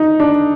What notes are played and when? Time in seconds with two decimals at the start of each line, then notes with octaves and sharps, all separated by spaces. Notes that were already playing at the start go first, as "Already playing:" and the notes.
Already playing: D#4
0.20 D4